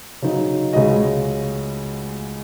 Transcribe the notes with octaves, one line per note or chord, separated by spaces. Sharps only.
C#3 F#3 D#4
C#2 C#3 G#3 F#4 D#5